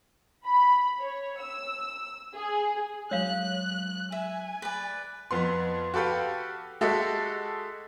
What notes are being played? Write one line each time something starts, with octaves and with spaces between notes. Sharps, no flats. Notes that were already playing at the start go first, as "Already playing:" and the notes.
B5
C#5
E6
G#4
F#3 G#3 C#5 F5 F#6
E5 G#5
B4 D5
F2 B3 C6
F#4 G4 A4 B4 F5 G5
G#3 F#4 G4 A4 D#5 E5